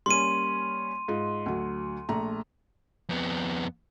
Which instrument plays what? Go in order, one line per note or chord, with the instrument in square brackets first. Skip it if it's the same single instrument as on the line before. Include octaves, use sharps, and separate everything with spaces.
[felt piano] G3 A#3 C#4 [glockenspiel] C6 D#7
[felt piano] G#2 F4
D2 F#3
A#1 A3 A#5
[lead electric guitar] F2 B3